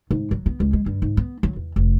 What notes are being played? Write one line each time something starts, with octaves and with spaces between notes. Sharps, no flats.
G#2
F#3
B3
C#2
G#3
G2
G#2
B3
F#3
E2
F1